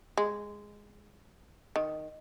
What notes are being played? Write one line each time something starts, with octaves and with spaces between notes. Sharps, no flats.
G#3
D#3